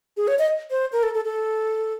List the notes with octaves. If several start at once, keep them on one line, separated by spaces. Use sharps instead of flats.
G#4
C#5
D#5
C5
A#4
A4
A4
A4